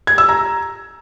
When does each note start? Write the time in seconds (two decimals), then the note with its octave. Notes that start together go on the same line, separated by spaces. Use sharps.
0.07 G#6
0.18 E6
0.29 A#5